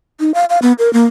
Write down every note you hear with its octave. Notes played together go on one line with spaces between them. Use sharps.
D#4
F5
F5
B3
A#4
A#3